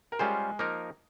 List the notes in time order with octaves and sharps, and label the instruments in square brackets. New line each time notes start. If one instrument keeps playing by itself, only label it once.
[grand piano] A#4
[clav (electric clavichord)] G3 C#4 F4 C5 [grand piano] G#3 G#4
[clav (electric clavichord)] F3 A#3 D#4 A#4